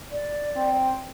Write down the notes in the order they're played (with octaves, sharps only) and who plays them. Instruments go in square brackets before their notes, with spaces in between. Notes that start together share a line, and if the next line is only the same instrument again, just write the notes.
[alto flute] D5
[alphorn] C4